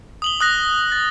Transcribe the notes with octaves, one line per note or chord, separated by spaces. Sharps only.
D#6 F#7 G7
D#6 F#6 A#6
A6